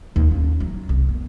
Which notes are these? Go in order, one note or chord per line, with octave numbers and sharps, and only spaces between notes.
D#2
C#4
F#3
C2
B3